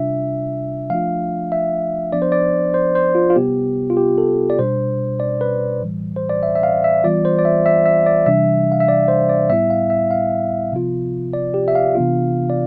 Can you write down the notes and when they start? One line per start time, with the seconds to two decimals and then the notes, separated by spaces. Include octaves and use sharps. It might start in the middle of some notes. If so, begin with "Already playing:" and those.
Already playing: C3 G3 D4 F4 E5
0.90 F3 A3 D4 F4 F5
1.52 E5
2.13 F3 B3 D4 D5
2.22 C5
2.32 D5
2.74 C5
2.95 C5
3.15 F4
3.30 F4
3.36 C3 G3 B3 G4
3.90 F4
3.97 G4
4.18 A4
4.50 D5
4.59 B2 G3 D4 C5
5.20 D5
5.41 B4
5.82 A2 E3 G3
6.16 C5
6.30 D5
6.43 E5
6.55 E5
6.63 F5
6.84 E5
7.04 E3 G3 B3 F4 D5
7.25 C5
7.39 D5
7.45 E5
7.66 E5
7.86 E5
8.06 D5
8.26 C3 E3 G3 D4 E5
8.72 F5
8.80 E5
8.88 D5
9.08 C5
9.29 D5
9.49 A2 G3 B3 E4 E5
9.70 F5
9.90 E5
10.11 F5
10.72 C3 F3 B3 F4
11.33 D5
11.54 G4
11.68 E5
11.75 F5
11.95 C3 E3 B3 D4 F4
12.50 D5